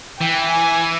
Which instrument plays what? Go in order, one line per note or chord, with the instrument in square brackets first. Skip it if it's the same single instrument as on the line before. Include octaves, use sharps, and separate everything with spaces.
[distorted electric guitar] E3 [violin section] G5
[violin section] G#5